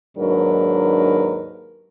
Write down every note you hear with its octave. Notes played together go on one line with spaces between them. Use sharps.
D#2 G#2 F#3 D4 A#4 B4